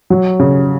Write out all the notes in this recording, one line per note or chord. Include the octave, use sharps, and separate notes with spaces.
F#3
C#3